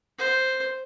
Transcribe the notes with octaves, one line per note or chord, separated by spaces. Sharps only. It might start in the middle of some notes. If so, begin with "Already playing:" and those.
C5